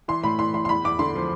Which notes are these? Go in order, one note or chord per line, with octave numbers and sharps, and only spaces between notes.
E3 C6
A2 B5
E3 C6
A2 C6
C6
E2 B5
E2 D6
D3 C6
F3